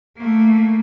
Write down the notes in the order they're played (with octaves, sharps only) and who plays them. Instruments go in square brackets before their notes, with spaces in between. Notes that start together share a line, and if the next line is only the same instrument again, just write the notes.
[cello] A3 A#3